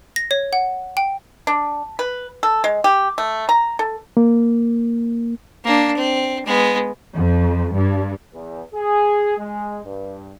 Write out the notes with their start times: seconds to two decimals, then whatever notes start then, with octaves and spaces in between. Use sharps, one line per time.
0.16 A#6
0.31 C#5
0.53 F#5
0.97 G5
1.47 D4
1.99 B4
2.43 A4
2.64 G#3
2.84 G4
3.18 A3
3.49 A#5
3.79 A4
4.17 A#3
5.65 A#3 D4
5.97 C4
6.46 G#3 B3
7.15 F2
7.75 G2
8.33 E2
8.74 G#4
9.38 G#3
9.84 G2